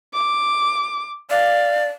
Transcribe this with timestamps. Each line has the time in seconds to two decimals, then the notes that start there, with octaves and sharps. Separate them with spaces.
0.13 D6
1.30 D5 F5